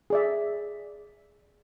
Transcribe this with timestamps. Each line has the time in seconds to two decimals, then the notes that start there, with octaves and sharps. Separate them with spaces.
0.10 G#4 D5 E5